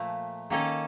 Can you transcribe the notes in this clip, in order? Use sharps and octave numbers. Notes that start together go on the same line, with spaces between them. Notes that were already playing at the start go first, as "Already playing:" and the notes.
Already playing: A#2 F3 A3
D#3 A#3 C#4 A4 D#5